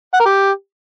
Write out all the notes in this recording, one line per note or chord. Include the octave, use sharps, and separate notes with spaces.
F#5
A#4
G4